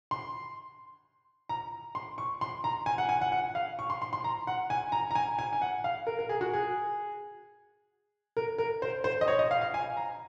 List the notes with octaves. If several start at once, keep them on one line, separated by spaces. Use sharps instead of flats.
C6
A#5
C6
C#6
C6
A#5
G#5
F#5
G#5
F#5
F#5
F5
C#6
C6
C6
C6
A#5
F#5
G#5
A#5
A#5
G#5
G#5
G#5
F#5
F5
A#4
A#4
G#4
F#4
G#4
A#4
A#4
C5
C5
D#5
C#5
D#5
F5
F5
G#5
A#5